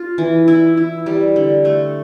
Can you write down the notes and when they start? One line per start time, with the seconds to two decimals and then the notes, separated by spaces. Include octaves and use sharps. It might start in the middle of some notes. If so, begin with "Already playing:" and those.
Already playing: F4
0.18 E3
0.48 E4
0.77 E4
1.06 G3
1.36 D3
1.65 A3